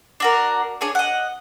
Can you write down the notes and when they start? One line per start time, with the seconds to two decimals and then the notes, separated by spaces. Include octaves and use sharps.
0.20 D4 F#4 A#4
0.81 D4 G#4 C#5
0.95 D#5 F#5